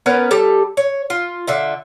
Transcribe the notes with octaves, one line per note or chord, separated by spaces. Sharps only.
B3 C#4 A#4 B4
G3 G4 A4 A5
C#5
F4
D3 F4 E5